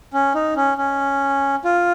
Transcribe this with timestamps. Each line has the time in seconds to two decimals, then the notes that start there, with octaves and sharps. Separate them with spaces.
0.13 C#4
0.35 D#4
0.56 C#4
0.78 C#4
1.64 F4